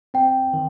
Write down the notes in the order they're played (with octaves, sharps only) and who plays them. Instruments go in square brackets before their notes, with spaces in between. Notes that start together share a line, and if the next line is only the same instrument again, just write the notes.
[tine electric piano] C4 [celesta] G5
[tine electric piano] D#3